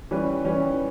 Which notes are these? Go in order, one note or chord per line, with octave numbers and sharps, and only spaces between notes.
E3 G3 C#4 G4 B4
E3 G3 C#4 G4 B4